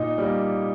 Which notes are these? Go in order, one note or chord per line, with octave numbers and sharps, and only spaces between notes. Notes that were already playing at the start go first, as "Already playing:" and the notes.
Already playing: A#2 D#4 D#5
G3 A#3